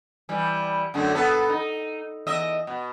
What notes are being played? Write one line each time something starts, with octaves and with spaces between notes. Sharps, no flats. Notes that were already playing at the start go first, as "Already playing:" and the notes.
E3 G3
F#2 D3 A3
B3 A4
D#4
E2 D#5 E5
B2